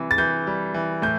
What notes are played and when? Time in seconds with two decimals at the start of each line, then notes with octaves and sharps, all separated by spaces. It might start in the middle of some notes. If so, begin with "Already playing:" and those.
Already playing: C3 E3 G3
0.11 A6
0.18 E3 G6
0.47 G3
0.74 E3
1.02 A2 G6